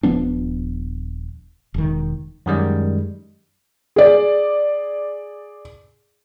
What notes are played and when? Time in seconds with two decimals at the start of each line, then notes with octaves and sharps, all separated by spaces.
0.03 D#1 F3 B3 D4
1.74 E1 D#3
2.46 F#2 D#3 G3 G#3
3.96 G#4 D5